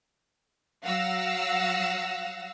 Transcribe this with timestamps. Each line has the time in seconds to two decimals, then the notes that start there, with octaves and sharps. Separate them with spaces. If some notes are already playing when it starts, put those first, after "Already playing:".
0.84 F#3 F5 F#5 E6 A#6